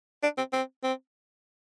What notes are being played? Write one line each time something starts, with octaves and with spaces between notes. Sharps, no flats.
D4
C4
C4
C4